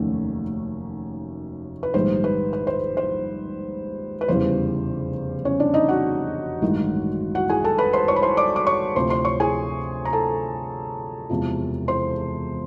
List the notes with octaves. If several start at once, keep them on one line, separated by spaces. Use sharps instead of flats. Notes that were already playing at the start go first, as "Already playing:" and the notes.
Already playing: F1 D#2 D#3 F#3 A3 C#4
B4
A#1 G#2 D#3 G3 C5
B4
B4
C5
C5
B4
F1 E2 C#3 E3 G3 C5
C#4 C#5
D4 D5
D#4 D#5
F#4 F#5
A1 G2 D#3 G#3
F#4 F#5
G#4 G#5
A4 A5
B4 B5
C5 C6
C#5 C#6
B5
C5 C6
D5 D6
D6
C#5 C#6
D2 C3 F3 C5 C6
C5 C6
C#5 C#6
G#4 G#5
A#5
A4 A5
E1 E2 C3 F3
C5 C6